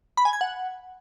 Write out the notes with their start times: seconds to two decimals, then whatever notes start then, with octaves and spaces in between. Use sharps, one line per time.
0.17 B5
0.25 G#5
0.33 G#6
0.41 F#5